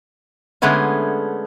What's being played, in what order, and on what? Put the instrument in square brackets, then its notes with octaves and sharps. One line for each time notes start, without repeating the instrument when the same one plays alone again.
[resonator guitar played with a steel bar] D3 G#3 A3 B3 C#4